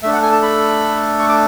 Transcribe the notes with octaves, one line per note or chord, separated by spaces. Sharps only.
A3 D4 A4 E5
F#5
G#5
A5
B5
C#6
D6